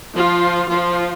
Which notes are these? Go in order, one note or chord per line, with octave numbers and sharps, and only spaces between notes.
F3 F4
F3 F4